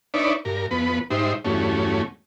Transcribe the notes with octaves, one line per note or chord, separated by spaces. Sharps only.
D4 D#4 B4 C#5 D5 E5
G2 A#4
F2 B3 B4
G#2 G3 D#4 C5 E5
E2 G2 F#3 A3 C#4